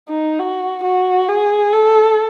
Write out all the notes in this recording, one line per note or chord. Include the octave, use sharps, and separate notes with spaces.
D#4
F#4
F#4
G#4
A4